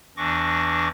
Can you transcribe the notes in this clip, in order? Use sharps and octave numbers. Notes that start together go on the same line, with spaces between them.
E2 E3 D4 C#6 D6 A#6